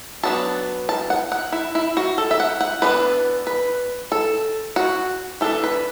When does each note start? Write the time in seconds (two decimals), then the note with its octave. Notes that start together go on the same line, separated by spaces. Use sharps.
0.23 F#3 B3 D4 A5
0.89 A5
1.10 F#5
1.32 F#5
1.52 E4
1.75 E4
1.97 F#4
2.18 A4
2.31 E5
2.40 F#5
2.61 F#5
2.82 E3 B3 D4 B4
3.47 B4
4.12 A4
4.76 F#4
5.41 E3 B3 D4 A4
5.64 B4